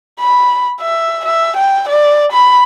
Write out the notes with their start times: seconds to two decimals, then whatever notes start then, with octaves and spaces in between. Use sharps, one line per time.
0.20 B5
0.81 E5
1.25 E5
1.57 G5
1.89 D5
2.32 B5